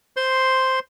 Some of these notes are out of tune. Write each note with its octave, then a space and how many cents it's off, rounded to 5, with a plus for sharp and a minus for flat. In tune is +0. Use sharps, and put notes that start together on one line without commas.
C5 +0 C6 +0